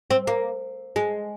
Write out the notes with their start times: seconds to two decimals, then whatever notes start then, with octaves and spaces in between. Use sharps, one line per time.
0.10 C4
0.27 A#3
0.96 G#3